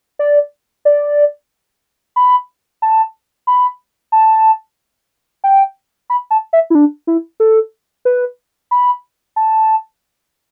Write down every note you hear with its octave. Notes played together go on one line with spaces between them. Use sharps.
D5
D5
B5
A5
B5
A5
G5
B5
A5
E5
E4
D4
E4
A4
B4
B5
A5